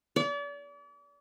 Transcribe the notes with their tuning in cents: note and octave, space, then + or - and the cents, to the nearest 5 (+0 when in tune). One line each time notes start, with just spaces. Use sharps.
D5 -40